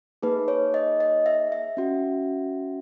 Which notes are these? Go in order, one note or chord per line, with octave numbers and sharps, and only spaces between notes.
A#3 D#4 G#4 B4
C#5
D#5
D#5
E5
E5
C#4 F#4